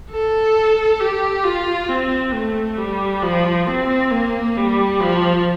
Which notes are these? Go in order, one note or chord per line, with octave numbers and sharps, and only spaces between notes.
A4
G4
F4
C4
A3
G3
F3
C4
A#3
G3
F3